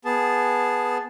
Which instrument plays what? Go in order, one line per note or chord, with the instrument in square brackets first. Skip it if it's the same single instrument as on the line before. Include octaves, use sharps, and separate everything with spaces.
[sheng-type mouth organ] B3 G#4 A5